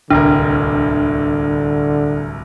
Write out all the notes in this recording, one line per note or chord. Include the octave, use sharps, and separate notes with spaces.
D1 C2 D3 D4 A#4